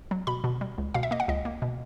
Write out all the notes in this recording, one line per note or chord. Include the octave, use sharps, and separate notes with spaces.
F#3
B2 B5
B2
G3
C#2
B2 F5
E5
A#3 D#5
F#5
C#2 D#5
A#3
B2